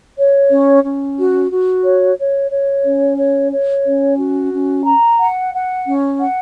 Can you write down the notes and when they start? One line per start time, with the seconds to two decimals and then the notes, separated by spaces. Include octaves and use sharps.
0.16 C#5
0.50 C#4
0.83 C#4
1.17 F#4
1.50 F#4
1.83 C#5
2.18 C#5
2.51 C#5
2.84 C#4
3.18 C#5
3.51 C#5
3.85 C#4
4.18 F#4
4.52 C#4
4.85 A#5
5.19 F#5
5.52 F#5
5.86 C#4
6.19 F#5